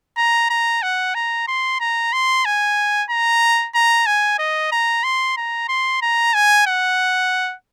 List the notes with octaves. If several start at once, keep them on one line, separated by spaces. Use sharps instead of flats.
A#5
A#5
F#5
A#5
C6
A#5
C6
G#5
A#5
A#5
G#5
D#5
A#5
C6
A#5
C6
A#5
G#5
F#5